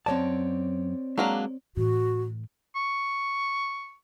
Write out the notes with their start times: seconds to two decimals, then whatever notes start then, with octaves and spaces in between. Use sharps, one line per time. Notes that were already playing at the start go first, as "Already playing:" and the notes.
0.06 F#2 G#3 C4 C#5 D5 A5
1.18 F#3 G#3 A#3 D4
1.77 A2 E3 F#4
2.76 C#6